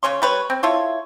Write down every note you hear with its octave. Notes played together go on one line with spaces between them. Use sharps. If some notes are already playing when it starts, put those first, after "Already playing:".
C#3 C#4 C#5 C6
G3 B4 C#5
C4
E4 F4 A4 C#5